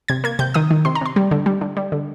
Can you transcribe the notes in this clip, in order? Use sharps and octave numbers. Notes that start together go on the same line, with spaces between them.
C3 G#6
A#3 G#6
C3 G6
D#3 D#6
D#3
C3 C6
A#5
C3 C6
G3
D3
G3
D3
G3
D3